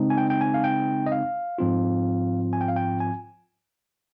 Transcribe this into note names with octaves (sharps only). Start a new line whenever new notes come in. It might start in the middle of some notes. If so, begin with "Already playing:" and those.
Already playing: C#3 G#3 C4 D#4
G#5
G5
G5
G#5
F5
G5
D#5
F5
G#2 F3 C4 F4
G#5
G5
F5
G5
G#5